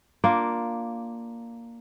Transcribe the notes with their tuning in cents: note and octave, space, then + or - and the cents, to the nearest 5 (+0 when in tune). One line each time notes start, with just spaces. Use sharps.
A#3 +0 D4 +0 F4 +0